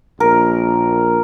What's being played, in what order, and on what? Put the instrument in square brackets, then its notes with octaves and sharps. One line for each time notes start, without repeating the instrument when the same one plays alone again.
[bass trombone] A#1 [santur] A#4